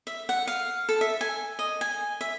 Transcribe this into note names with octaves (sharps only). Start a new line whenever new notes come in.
E5
F#5
F5
A4
E5
G#5
D#5
G#5
E5